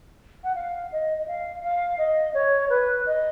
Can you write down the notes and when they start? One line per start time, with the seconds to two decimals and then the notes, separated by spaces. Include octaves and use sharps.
0.44 F#5
0.55 F5
0.92 D#5
1.18 D#5
1.28 F5
1.63 F5
1.98 D#5
2.34 C#5
2.70 B4
3.06 D#5